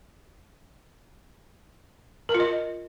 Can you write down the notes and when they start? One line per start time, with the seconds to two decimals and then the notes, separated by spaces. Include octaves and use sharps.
2.29 A#4
2.34 F4
2.40 D#5